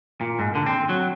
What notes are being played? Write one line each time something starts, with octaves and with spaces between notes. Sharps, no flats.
A#2
G#2
D3
C4
F#3